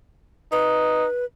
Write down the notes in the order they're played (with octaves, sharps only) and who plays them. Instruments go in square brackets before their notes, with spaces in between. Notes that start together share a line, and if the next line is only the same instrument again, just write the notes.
[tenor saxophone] D#4 [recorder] B4